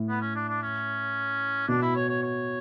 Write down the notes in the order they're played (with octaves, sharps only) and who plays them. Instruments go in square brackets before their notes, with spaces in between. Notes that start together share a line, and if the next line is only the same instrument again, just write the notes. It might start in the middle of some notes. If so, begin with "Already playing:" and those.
Already playing: [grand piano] A2
[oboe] B3
C#4
D4
D4
C#4
[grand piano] B2 [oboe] D4
[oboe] E4
C#5
C#5
C#5